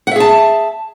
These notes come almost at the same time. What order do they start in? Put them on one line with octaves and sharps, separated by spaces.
F#5 E5 G#4 A5